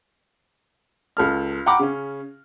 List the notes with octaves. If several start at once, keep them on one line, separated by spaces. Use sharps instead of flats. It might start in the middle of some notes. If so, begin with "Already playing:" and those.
C#2 A4 F6
F#5 G5 A#5 B5 D6
C#3 C#4